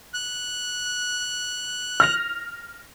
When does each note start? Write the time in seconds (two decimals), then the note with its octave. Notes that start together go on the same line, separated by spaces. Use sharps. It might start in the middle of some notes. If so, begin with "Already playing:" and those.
0.14 F#6
2.00 F6 A#6 F7